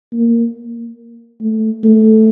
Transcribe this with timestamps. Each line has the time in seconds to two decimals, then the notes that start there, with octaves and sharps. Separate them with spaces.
0.13 A#3
1.41 A3
1.84 A3